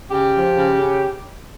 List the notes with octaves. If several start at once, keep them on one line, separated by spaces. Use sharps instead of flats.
C#3 G4
F3
C#3
C#3